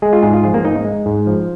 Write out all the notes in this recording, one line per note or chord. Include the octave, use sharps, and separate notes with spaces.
G#3 G#4
F4
G#2 G#4
F4
F3 G#4
A#3 A#4
G#2 D#4 D#5
G#3
G#2
F3